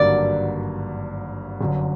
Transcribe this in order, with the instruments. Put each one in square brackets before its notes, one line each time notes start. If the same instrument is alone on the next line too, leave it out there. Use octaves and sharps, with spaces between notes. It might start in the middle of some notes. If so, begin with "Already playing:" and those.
Already playing: [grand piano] G#1 G2 D3 F#3 A#3 [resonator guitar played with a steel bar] D5
[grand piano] G1 F#2 D3